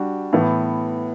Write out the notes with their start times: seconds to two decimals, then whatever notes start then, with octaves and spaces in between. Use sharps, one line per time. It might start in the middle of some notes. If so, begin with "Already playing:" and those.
Already playing: G3 D4 F#4
0.33 A2 E3 B3